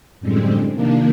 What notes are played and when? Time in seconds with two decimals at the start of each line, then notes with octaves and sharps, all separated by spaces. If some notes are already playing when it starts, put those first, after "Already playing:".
0.20 F#2 A2 D3 G3 G#3 C4
0.74 C3 D#3 F3 A#3 D4